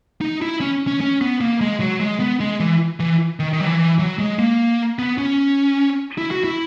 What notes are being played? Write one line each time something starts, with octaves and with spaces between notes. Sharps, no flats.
D#4
E4
C#4
C#4
C#4
B3
A#3
G#3
F#3
G#3
B3
G#3
E3
E3
D#3
D#3
F#3
E3
E3
F#3
G#3
A#3
B3
C#4
E4
F#4
E4